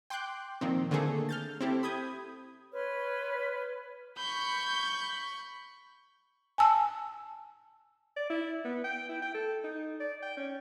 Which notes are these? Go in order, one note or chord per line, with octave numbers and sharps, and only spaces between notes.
G5 C6 D6 F#6 G6
A#2 D#3 F3 C4
D3 A3 A#3 G#4 A4
F6 G6 A6
C4 E4 G4 A4
B5 D#6 G6 G#6
B4 C#5 C6 F6
B5 C#6 G6
G#5 A5 E6
D5
E4
B3
G5
E4
G5
A4
D#4
D5
G5
C#4